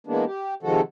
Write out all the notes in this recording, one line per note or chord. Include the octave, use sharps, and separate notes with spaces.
E3 G#3 A#3 B3 D4
G4
C3 D#3 F3 G#3 F#4 A4